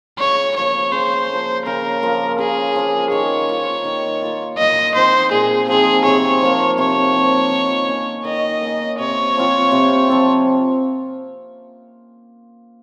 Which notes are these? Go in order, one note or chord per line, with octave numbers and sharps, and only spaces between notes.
C#3 C#5
F3 A#3 C#5
C#3 C5
F3 A#3
C#3 A#4
F3 A#3
C#3 G#4
F3 A#3
D#3 C#5
A#3 F4
D#3
A#3 F4
A#2 D#5
F3 C4 D#4 C5
A#2 G#4
F3 C4 D#4 G#4
C3 C#5
F3 A#3
C3 C#5
F3 A#3
D#3
A#3 C#4
D#3 D#5
A#3 C#4
C3 C#5
F3 C4 F4
C3
F3 C4 F4